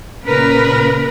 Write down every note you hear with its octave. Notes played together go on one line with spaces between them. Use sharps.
A#2 C#3 A#4 B4